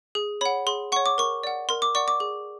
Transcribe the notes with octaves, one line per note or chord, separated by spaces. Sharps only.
G#4
C#5 F#5 B5
G#4 C6
C#5 F#5 C#6
D6
A#4 C#6
D5 F#5
A#4 C6
D6
D5 F#5 C#6
D6
G#4